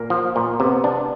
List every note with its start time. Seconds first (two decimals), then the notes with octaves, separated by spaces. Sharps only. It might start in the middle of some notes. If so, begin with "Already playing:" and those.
Already playing: A#2 A#3 A#4
0.10 F3
0.36 A#2
0.60 C3 B3 B4
0.84 D4